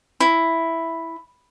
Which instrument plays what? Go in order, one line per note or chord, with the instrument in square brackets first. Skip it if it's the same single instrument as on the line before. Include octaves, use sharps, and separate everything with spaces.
[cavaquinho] E4